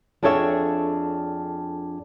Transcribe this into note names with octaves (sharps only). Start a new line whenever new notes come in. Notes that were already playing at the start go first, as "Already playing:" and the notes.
F2 D4 G#4 A4 C#5 E5